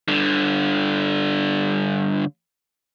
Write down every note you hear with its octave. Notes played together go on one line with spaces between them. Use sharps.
G2 D3